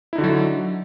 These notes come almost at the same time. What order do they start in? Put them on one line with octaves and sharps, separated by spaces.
E4 D#4 D3 F#4 F#3